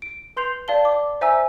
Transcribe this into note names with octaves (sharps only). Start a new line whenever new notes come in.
D7
B4 C6 G6 C7 F7
D5 F5 A5 G7
D6
C5 E5 G#5 A#5 E6